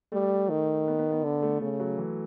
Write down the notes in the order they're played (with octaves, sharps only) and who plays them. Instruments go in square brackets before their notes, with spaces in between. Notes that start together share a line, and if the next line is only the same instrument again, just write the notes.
[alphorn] G3 [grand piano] A3
[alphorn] D#3
[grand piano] B3
B3
B3
[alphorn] D3
[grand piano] A3
[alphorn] C#3 [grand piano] A3
[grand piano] F#3
E3